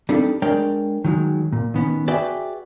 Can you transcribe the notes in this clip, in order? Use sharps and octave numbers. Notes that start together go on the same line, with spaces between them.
G3 C4 D4 D#4 A4
G#3 D4 A#4 C#5 D5 G5
D#3 F#3 G#3
A#2
D#3 B3 C#4
F#4 G#4 B4 D5 E5 G5